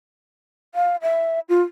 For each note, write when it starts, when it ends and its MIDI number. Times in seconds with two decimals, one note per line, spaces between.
0.75 0.96 77
1.02 1.40 76
1.49 1.62 65